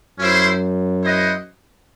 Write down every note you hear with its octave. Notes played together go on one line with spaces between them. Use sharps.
F#2 C#4 E4 C5
E4 C5 D#5 F#5